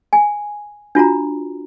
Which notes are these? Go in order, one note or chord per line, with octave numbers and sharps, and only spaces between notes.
G#5
D4 F4 F#4 A#5